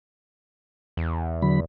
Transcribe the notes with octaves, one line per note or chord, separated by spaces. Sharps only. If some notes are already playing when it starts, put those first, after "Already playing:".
E2
D3 F#3 B5